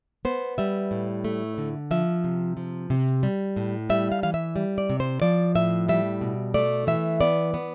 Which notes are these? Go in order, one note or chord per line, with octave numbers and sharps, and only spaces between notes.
B3 C5
G3 E5
A2
A3
D3
F3 E5
C3
F3
C3
G3
A2
G3 E5
F5
E3 F5
E5
G3
D5
C3
C5
F3 D5
A2 E5
G3 E5
B2
A3 D5
E3 E5
B3 D5
B3